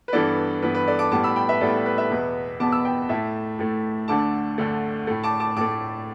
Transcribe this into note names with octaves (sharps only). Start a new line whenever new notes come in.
B4
G2 E3 B3 A4 D5
G2 E3 B3 B4
B4
A4 D5
A5 D6
A2 G3 B3 A5 D6
B5 E6
G5 B5
B4 E5
A2 G3 B3 A4 D5
B4
B4
B4 E5
E2 B2 B3
E2 B2 B3 A5 D6
B5 E6
G5 B5
A2 A3 E5 A5
A2 A3
D2 D3 A3 A5 D6
D2 D3 A3
A2 A3
A5 D6
A5 D6
A2 A3 A5 D6